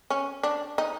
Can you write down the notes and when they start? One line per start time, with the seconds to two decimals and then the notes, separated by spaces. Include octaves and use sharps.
0.10 C#4
0.43 D4
0.78 D#4